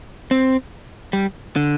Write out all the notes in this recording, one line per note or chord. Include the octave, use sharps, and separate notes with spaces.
C4
G3
D3